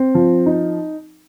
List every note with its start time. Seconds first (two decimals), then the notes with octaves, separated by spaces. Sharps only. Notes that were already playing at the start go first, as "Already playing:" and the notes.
Already playing: C4
0.15 F3
0.46 D#4